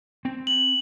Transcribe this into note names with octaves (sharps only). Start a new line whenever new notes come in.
C4
F#7